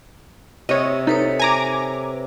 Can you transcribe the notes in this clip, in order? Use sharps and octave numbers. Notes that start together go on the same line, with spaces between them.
C3 C#5 D#5
D#4 A4 B4 C#5
G#5 A#5 D6